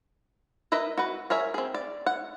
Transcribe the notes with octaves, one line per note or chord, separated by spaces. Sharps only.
A#4 B4 D#5 E5
F#4 B4
G#4 A#4 C#5 E5
C4 G#4
D5
F#5